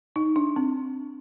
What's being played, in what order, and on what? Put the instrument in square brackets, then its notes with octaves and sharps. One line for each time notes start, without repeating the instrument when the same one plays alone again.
[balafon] D#4
D4
C4